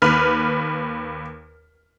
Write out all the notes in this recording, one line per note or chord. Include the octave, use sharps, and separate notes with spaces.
D#2 B4 F6